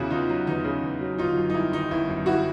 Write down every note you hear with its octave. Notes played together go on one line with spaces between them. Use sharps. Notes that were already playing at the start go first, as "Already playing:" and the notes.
Already playing: E2 C#3 E4 F#4
E2 D#4 F4
F#3 D#4
E2 D#4
C#3
E2
F#3
G1 D#4 F4
F#2
D#4
G3 E4
D#3 D#4
G1 E4
F#2
G3 E4 F#4